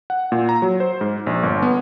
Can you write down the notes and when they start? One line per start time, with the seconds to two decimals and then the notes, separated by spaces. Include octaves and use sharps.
0.10 F#5
0.32 A#2
0.49 A#5
0.62 F#3
0.80 C5
1.01 G#2
1.27 A#1
1.43 G1
1.62 B3